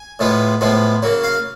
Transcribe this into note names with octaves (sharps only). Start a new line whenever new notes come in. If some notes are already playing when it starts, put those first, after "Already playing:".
Already playing: G#5
A2 F3 G#3 B3
A2 F3 G#3 B3
C#3 F#3 A#3
F5